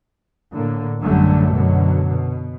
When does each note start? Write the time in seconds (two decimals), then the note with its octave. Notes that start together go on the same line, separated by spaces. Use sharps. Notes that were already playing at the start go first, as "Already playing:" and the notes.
0.53 A2 D3 A#3
1.02 A1 F#2 D3 F#3 G3 A3
1.54 F#2 B2 D3 F#3
2.09 B2